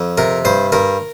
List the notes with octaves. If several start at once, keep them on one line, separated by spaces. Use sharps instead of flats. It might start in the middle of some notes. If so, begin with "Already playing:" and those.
Already playing: F2
C3 A#4
G2 C5
G2 A#4